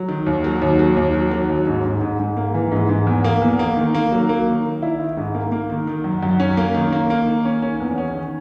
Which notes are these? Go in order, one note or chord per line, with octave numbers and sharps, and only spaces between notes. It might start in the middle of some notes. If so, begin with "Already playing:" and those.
Already playing: F#3
D#3
D#2
F#3
D#2
F#3
D#2
F#3
F#3
D#2
G#2
G#2
G#2
G#2
A#3
E3
G#2
G#2
E2
A#3
E2
A#3
D#3
A#3
F#3
A#3
D#3
D#3
E4
D#3
G#2
A#3
A#3
D#3
D#3
F#2
F#2
C#4
A#3
D#3
A#3
A#3
D#3
C#4
C#4
E2
C#4
D#3